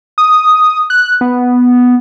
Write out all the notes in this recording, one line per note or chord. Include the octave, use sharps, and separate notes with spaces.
D#6
F#6
B3